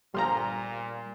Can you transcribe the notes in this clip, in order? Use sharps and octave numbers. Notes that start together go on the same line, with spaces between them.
G1 A#2 F3 G3 A#5 C6 F6